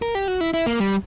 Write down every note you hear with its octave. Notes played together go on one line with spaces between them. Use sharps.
A#4
G4
F#4
E4
E4
A#3
G3